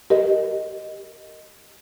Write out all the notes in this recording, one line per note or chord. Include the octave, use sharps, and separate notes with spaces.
G4 A#4 D#5